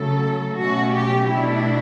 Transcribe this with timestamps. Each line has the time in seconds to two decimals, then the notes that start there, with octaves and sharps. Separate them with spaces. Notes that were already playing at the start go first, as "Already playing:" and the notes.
Already playing: C#3 F#3 A3 A4
0.56 B2 F#3 A3 C#4 F#4
0.93 G4
1.30 B2 A3 D4 E4